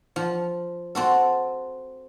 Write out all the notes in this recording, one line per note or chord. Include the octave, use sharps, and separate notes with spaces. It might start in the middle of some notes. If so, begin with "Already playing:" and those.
F3
C4 F#4 A4